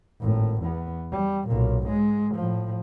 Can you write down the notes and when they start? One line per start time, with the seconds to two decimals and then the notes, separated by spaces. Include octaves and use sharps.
0.21 G#1 A2
0.62 E2 B3
1.11 G3
1.48 B1 A#2
1.84 G#2 G#3
2.35 A2 F3